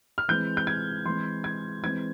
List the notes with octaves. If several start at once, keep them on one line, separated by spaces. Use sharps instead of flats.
F6
E3 G#3 C4 G6
G6
G#6
E3 G#3 C4 C6
G#6
E3 G#3 C4 G#6